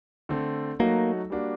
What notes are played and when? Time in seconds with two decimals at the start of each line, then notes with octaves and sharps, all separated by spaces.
0.29 D3 A3 C4
0.79 F#3 A3 A#3 D#4 F#4
1.30 G3 A#3 D4 F#4